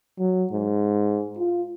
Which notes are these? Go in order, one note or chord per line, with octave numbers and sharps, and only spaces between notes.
F#3
G#2
F4